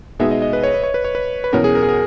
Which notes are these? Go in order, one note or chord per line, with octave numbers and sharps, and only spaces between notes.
B2 G#3 B3 D#4 G#4 E5
D#5
D#5
B4
C#5
B4
C#5
B4
C#5
B4
B4
E2 B2 F#3 C#4 A#4
G#4
A#4
G#4
A#4